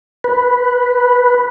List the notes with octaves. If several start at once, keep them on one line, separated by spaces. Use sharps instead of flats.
B4